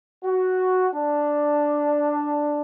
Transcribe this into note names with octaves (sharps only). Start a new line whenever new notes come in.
F#4
D4